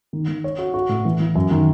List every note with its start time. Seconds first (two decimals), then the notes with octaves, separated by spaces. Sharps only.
0.13 D#3
0.28 D#3
0.44 C#5
0.58 F#4
0.74 F#4
0.89 A2
1.05 E3
1.20 E3
1.35 F#2
1.51 D#3